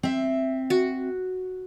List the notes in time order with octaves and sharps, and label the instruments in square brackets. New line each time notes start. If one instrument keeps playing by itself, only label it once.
[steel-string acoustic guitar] C4 E5
[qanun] F#4